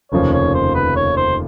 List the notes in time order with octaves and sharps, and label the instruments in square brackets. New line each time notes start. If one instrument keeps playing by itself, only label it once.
[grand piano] F1 D#2 C#3 F3 [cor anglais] C#5
[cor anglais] C#5
C5
B4
C#5
C5